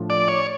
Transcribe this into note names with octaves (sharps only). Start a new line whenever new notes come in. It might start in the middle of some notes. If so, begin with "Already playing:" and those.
Already playing: A2 F3 A3 D4 F4
D5
C#5